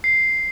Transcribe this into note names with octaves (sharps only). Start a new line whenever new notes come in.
C7